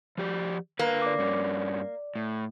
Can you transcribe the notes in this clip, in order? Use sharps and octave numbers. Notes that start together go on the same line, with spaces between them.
F3 G4 D5
D3 A#3 B4
D5 D6
G2 C#4 D5
A2